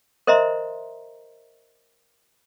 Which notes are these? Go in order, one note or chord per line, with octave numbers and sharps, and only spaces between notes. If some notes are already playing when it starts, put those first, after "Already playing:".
A#4 C5 D#5 E5 A#5 C6